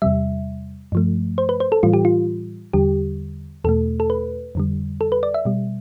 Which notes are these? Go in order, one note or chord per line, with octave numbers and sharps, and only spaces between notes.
E2 C3 G3 E5
G2 F3 A3
C5
B4
C5
A4
A2 E3 G3 F4
G4
F4
E2 D3 G3 G4
E2 B2 A3 A4
A4
B4
F2 D3 G3
A4
B4
D5
E5
B2 G3